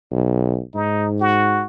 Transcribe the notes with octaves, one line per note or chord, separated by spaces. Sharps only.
B1
G#2 D#4
F#4